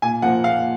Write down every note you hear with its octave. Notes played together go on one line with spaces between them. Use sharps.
A#2 G#5
F3 A#3 F#5
A#2 F5